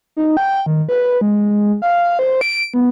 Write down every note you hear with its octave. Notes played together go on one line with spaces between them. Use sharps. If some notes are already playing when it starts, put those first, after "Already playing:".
D#4
G5
D#3
B4
G#3
F5
C5
D7
B3